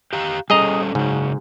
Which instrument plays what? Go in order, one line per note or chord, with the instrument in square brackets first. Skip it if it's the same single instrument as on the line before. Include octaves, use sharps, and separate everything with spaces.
[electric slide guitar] G4 F5 A#5
[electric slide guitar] G3 C#4 A4 [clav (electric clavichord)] G#4 D#5 A#5
[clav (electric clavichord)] G#2 [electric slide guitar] C#3 F#3